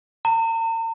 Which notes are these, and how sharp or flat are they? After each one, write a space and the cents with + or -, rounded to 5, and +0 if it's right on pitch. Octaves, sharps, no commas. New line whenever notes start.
A#5 -45